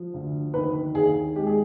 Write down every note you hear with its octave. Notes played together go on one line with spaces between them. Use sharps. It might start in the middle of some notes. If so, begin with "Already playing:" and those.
Already playing: F3
D2
D#3 B4
D#2 G#4
G#3 G4
G#4